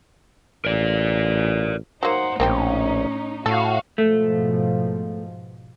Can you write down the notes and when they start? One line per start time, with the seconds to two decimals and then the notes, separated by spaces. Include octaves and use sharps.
0.65 A1 A#4 D5
2.03 F#3 A#3 D#4 C5 F#5
2.40 A#1 A2 A#3 C4 C#4 G4
3.46 A2 F#4 A4 F5
3.98 G#2 B2 F3 A3